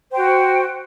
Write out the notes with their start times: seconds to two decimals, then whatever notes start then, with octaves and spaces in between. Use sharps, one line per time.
0.10 C5
0.13 G5
0.16 F#4